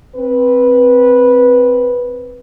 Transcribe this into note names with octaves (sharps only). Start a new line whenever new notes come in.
C4 B4